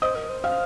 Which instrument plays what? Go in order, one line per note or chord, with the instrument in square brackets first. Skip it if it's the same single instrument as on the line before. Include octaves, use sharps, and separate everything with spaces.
[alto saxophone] C5 [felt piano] D#5 D#6
[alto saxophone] A#4
C5
[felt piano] F5 F6